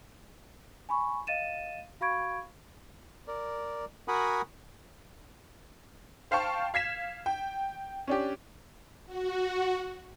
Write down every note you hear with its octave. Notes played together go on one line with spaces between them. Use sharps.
G#5 B5 C#6
D#5 F5 A6 D#7 E7
F#4 F5 B5 C#6 G#6 D7
A#4 D5
F#4 A#4 F#5 G#5 B5 D#6
C5 F5 G5 A5 C#6
F5 G#6 B6 E7
G5
C#4 D4 G4
F#4